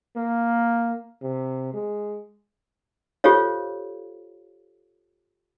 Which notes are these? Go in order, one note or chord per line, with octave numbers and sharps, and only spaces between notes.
A#3
C3
G#3
F4 G4 A4 C5 C#5 F5